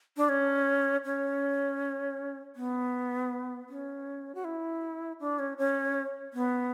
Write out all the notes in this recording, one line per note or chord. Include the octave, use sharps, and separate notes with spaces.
D4
C#4
C#4
B3
C#4
F#4
E4
D4
C#4
C#4
B3